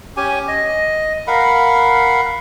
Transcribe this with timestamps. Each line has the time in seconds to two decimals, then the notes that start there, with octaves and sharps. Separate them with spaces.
0.17 C#4 G4 G#5
0.48 D#5
1.27 A#4 F5 F#5 B5